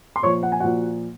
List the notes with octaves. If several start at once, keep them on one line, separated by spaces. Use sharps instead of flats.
C6
A#2 F3 C#5 C#6
F#5
G#5
A#2 F3 F#4 F#5